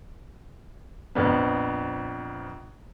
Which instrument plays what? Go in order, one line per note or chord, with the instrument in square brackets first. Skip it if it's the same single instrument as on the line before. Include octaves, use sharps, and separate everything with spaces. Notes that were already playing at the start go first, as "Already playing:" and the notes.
[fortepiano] A#1 F2 B3